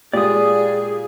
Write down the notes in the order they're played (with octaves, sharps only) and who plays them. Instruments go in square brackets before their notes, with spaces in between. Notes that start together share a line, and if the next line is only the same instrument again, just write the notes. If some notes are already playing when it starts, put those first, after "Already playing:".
[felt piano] A#2 G#3 G4 [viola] G#4 [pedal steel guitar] D5 D#6